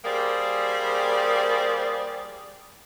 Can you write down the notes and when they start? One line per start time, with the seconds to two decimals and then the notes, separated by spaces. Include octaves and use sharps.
0.05 G3 A#3 G#4 C5 D5